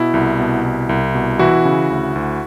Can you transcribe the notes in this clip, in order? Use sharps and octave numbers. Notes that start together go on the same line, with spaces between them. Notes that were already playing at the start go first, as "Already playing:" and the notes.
Already playing: B2 E4
C2
B2
C2
C2
B2
E3 E4 F#4
C#3
D2
D2